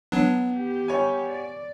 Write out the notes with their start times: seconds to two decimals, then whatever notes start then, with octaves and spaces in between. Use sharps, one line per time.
0.12 F#3 B3 D4
0.54 G4
0.88 G3 C#5 G#5
1.31 D5